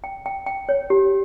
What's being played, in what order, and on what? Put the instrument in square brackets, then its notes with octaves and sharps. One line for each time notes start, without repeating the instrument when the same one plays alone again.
[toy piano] G5
G5
G5
C#5
G4